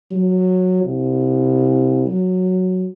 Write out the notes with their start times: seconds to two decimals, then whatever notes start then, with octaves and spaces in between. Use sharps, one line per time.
0.11 F#3
0.84 C2
2.07 F#3